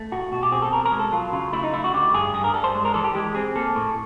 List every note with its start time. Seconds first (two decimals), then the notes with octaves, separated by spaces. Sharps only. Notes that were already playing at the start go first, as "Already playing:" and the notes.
Already playing: A3
0.12 A2 F#4
0.32 B2 F#4
0.43 G4
0.52 C4 G#4
0.62 A4
0.73 B2 A#4
0.85 A#4
0.92 G#3
0.99 A4
1.12 F#3 F4
1.33 C#3 F4
1.53 A3 E4
1.64 D#4
1.74 A3 E4
1.84 F#4
1.94 D3 G4
2.14 G2 G#4
2.34 G2 G#4
2.44 A#4
2.54 G3 A4
2.64 C5
2.75 G#3
2.85 A#4
2.94 E3 A4
3.04 G4
3.15 G#3 G4
3.35 C4 G#4
3.56 A#3 A4
3.75 A2